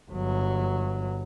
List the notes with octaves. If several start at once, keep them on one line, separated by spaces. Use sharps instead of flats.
G1 F#3